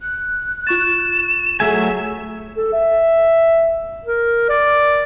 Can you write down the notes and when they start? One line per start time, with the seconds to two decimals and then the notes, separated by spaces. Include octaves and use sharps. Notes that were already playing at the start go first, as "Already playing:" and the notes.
0.01 F#6
0.67 F4 C#6 A6 E7
1.60 F#3 A3 G#4 E5 G#5
2.56 A4
2.73 E5
4.05 A#4
4.49 D5